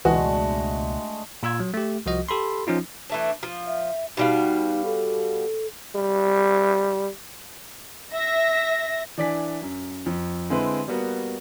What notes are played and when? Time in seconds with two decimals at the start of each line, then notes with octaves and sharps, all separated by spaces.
0.05 C#2 B2 E3 G#3 A3 D4 F#4
1.43 A#2 F4 E6 G#6
1.60 F#3
1.74 A3 G4
2.06 C2 F3 F#4 D#5
2.29 G4 A4 B5 C6
2.67 F3 C#4 D#4 F4
3.10 E3 A3 D4
3.43 F3
3.67 E5
4.17 B2 G3 D#4 F5
4.85 A4
5.95 G3
8.13 E5 A#6
9.18 E3 D4 D5 G#5 B6
9.62 F#2
10.06 F2
10.50 D3 G#3 C4 E4 B4
10.88 G3 A#3 B3 F#4